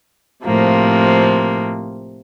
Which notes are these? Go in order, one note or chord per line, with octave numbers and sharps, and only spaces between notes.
A2 C3 F3 A#3